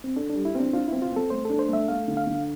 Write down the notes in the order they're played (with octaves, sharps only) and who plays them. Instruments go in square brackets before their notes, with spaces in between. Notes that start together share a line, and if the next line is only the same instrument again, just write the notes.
[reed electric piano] C4
[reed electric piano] D4 [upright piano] A4
[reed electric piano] D4
[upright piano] G3
[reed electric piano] E4
[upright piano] C4 [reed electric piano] D4
[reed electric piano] D4 [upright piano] F4
[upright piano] C4 [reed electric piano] E4
[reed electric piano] F4
[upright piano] C4 [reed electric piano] A4
[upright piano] A3 [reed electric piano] C5
[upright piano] D4 [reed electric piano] A4
[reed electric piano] C5
[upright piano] A3 [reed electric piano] E5
[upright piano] A3 [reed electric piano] F5
[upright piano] D3
[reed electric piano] F5
[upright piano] D3